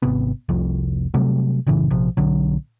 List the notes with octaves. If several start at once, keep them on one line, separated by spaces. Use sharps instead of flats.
G#1 C3 B3
F1 C2 F2
C3 F#3 G3 A3
F#1 A2 C#3 E3
A#1 C3 F3
B1 D3 F#3